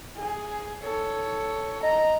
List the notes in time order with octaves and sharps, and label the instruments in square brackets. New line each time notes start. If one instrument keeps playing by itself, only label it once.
[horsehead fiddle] G#4
A4 C#5
[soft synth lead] D#5 [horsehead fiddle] A#5